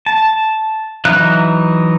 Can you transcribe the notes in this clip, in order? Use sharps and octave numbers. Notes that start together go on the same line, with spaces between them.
A5
E3 F#3 D#4 E5 F#6